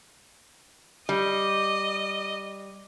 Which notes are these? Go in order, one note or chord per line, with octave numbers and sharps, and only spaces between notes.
G3 D#5